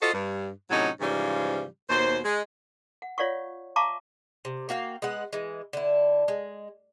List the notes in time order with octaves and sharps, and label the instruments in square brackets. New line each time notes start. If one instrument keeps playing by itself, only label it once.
[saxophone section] F4 F#4 A4 C5 D#5
G2
A2 C3 F#3 C#4 D#4
G#2 C#3 E3 F3 G3
D#2 B2 C5
G#3
[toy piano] F#5
F4 C#5 D5 F5 F#5 C#6
E5 F5 A5 A#5 C#6 D6
[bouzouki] C3
A#3 F#4 F5 G5
G#3 B3 F#5
E3 G#3
D3 E4
G#3